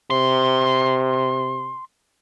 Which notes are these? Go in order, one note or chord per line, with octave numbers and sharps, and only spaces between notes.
C3 C6